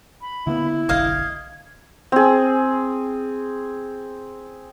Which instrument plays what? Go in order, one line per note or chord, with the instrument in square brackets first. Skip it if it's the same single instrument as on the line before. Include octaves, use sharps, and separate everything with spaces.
[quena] B5
[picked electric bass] D3 A#3 B3 [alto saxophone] E4
[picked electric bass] F#1 B1 D3 [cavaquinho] D#5 F5 [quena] G#6
[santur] C4 G#4